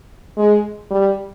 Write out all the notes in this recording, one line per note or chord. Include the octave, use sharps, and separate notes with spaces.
G#3
G3